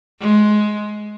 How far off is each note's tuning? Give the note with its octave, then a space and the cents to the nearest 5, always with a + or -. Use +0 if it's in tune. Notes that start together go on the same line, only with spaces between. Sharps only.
G#3 +15